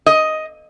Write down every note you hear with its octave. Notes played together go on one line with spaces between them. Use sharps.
D#5